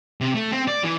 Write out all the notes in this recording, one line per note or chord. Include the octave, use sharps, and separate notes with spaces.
C3
A3
C4
D5
E3